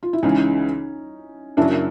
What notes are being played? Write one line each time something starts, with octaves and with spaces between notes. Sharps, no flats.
F4
E4
C#2 C#3 E3 C#4 D#4
F#2 C#3 F#3 A#3 D4 E4